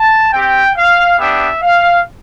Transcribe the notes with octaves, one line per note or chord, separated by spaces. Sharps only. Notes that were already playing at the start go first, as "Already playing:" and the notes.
Already playing: A5
C4 G4 G5
F5
B3 D4 G4 E5
F5